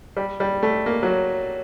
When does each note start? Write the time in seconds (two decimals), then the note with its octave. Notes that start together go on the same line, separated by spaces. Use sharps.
0.17 G3
0.40 G3
0.63 A3
0.86 A#3
1.03 F#3